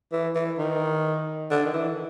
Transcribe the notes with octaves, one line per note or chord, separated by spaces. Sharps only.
E3
E3
D#3
D3
D#3
E3